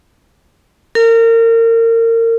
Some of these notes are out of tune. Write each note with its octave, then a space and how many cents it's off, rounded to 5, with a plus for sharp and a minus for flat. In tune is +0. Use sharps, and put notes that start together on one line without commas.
A#4 -30